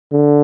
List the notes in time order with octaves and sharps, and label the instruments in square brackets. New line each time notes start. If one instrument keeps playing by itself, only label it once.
[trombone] D3